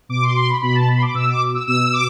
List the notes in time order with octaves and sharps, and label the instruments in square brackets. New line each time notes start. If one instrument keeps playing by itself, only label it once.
[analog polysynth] B2 D6
C6
D6
C6
B5
B2 B5
A5
B5
C6
D6
B2 E6
D6
E6
B2 E6
D6